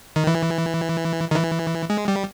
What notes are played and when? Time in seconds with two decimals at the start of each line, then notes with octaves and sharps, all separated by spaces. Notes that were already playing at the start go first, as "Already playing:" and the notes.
0.16 D#3
0.27 E3
1.31 D#3
1.36 E3
1.90 G#3
2.08 G3